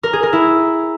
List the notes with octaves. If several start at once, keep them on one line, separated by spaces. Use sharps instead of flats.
A#4
G#4
A#4
E4